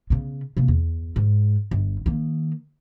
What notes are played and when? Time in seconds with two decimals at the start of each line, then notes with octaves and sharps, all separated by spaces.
0.10 C#3 B3
0.57 C3 A#3
0.68 E2
1.16 G#2
1.71 G1
2.06 D#3 A#3